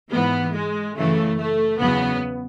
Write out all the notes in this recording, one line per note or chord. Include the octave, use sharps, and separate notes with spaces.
G#2 E3 B3
G#3
F#2 C#3 E3 A3
A3
E2 C#3 F#3 B3